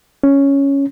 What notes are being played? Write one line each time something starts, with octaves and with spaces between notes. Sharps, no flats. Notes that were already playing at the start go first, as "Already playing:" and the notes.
C#4